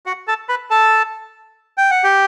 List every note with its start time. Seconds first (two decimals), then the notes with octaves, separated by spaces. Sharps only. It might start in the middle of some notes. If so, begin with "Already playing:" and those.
0.06 F#4 F#5
0.27 A4 A5
0.49 B4 B5
0.70 A4 A5
1.78 G5
1.91 F#5
2.04 G4 G5